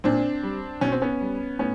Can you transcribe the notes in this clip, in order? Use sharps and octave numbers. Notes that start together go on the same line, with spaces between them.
A#2 C4 D4
G3
B2 C#4
C4
B3 C#4
G3
A2 B3 C#4